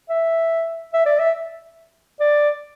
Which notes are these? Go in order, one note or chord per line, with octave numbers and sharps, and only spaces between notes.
E5
E5
D5
E5
D5